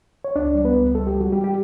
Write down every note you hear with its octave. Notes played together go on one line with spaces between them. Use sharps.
C#5
C#2 D4 D5
G3
B3 B4
C#2
G3 A4
G4
G3
F#4
G3 G4
G4